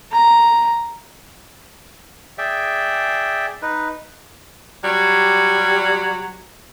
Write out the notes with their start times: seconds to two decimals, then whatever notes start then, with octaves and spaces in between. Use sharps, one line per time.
0.12 A#5
2.38 G#4 D5 E5 G5
3.62 D#4 B4
4.83 F#3 G3